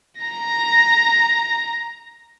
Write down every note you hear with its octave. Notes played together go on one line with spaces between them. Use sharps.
A#5 A#6